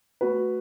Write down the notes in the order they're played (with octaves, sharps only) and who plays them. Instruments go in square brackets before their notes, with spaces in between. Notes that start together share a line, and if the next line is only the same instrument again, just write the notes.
[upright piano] A3 F#4 B4